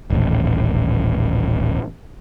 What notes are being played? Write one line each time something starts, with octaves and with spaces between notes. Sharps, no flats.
D#1 A1